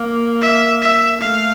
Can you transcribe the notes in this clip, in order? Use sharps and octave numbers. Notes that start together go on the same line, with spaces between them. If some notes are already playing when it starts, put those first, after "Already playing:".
Already playing: A#3
E5
E5
A3 F5